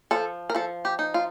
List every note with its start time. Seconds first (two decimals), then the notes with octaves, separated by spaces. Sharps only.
0.11 F3 A4
0.50 A#4
0.55 F3 A4
0.85 G4
0.99 D#4
1.14 F4